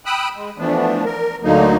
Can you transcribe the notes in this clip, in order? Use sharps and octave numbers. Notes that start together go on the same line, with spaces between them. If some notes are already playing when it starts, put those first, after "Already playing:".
G5 B5 D#6 E6 F#6
G#3
E3 F3 A3 B3 D4
A#4
D2 D3 F#3 A#3 D#4